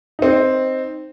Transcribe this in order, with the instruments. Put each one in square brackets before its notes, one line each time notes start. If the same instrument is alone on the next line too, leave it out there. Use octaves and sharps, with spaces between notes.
[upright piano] C4 D#4